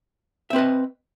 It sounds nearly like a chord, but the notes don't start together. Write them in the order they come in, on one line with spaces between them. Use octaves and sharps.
E5 C4 B4 D#5